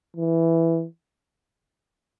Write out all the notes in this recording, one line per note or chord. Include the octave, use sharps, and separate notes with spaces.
E3